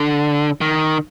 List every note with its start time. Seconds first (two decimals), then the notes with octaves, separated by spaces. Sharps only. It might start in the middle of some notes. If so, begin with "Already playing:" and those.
Already playing: D3
0.61 D#3